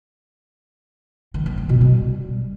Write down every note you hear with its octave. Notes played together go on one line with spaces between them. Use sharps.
D#3
A#3
D#3
B2
G3